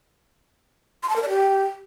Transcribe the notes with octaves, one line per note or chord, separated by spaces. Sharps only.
C6
A5
A#4
D5
G4